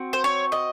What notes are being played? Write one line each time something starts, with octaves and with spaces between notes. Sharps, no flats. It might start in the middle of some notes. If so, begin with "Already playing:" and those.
Already playing: C4 F#4
C5
C#5
D#5